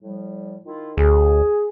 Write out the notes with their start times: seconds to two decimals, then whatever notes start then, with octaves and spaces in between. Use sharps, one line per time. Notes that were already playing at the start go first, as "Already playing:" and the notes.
0.02 A2 F3 G3
0.66 D#3 E4 F4
0.97 D2 G#4